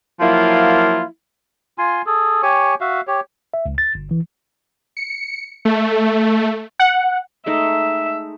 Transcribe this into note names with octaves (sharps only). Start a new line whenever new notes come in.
F3 F#3 A#3 E4 F4
F4 G#5 C6
G#4 A4
G4 C#5 G#5 C#6
F#4 E5 F5
G4 C#5
E5
C#2
A6
G1
E3
C#7
A3
F#5
G#3 A3 D#4 E5